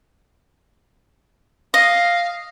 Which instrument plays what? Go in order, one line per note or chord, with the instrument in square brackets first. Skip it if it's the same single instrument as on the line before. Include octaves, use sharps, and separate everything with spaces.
[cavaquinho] D#5 [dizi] F5